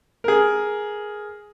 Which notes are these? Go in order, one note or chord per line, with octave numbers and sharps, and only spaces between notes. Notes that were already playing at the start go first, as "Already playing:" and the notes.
G#4 A#4